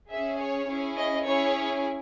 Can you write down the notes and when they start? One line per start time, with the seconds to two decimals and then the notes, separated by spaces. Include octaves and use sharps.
0.11 C#4 G#4 E5
0.39 C#5
0.68 C#4 E4 G#4
0.97 D#5
1.25 C#4 E4 G#4 C#5